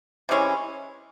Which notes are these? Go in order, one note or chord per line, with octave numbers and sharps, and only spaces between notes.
C3 E3 G#3 C#4